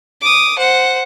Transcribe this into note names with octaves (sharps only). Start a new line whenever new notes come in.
D6 D#6
C5 F#5